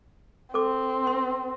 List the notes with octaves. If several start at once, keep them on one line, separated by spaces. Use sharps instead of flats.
C4 A4 D6
C6